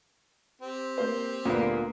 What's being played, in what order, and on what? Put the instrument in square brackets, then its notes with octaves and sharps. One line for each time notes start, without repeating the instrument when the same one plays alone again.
[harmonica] C4 G4
[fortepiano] A#3 C5
[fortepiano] D2 B3 [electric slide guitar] A#2 A#3